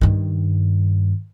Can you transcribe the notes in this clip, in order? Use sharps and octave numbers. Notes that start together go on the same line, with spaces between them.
G2 D#3